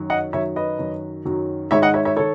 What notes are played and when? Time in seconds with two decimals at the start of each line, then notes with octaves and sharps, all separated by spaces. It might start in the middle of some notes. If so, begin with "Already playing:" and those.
Already playing: F#2 D#3 F#3
0.10 D#5 F#5
0.33 F#2 D#3 F#3 C#5 E5
0.56 B4 D#5
0.79 F#2 D#3 F#3
1.25 F#2 D#3 F#3
1.71 G#2 D#3 G#3 C#5 E5
1.82 D#5 F#5
1.94 C#5 E5
2.05 C#5 E5
2.16 D#3 A4 C#5